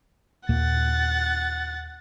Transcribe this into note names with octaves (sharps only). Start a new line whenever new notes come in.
D#2 A#2 A#3 F#5 A6